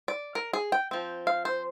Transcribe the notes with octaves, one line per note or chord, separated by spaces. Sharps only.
D5
A#4
G#4
G5
F3 C4
F5
C5